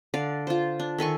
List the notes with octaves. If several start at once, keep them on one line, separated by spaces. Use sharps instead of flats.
D3 D5 F5
F4 C5
D4
D#3 A4 G#5 C#6